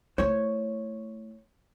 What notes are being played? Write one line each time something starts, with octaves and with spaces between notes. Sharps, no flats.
A3 E4 C5 C#5